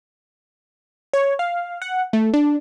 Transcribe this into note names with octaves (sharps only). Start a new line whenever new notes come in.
C#5
F5
F#5
A3
D4